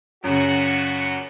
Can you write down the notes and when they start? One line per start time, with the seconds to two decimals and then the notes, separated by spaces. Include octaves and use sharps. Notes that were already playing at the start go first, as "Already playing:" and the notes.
0.24 F#2 A#2 C#3 F#4